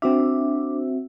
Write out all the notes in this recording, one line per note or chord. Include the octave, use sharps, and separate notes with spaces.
C4 D4 F#4 E5